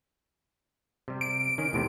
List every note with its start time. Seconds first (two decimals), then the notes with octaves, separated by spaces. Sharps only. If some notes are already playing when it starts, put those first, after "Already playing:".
1.08 C3 G3
1.21 D7
1.58 D#3 C#4
1.73 E2 A2 C3